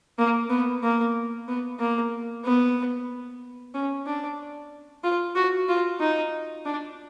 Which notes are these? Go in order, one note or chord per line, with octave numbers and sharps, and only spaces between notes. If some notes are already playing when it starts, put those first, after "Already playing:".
A#3
B3
A#3
B3
A#3
B3
C#4
D4
F4
F#4
F4
D#4
D4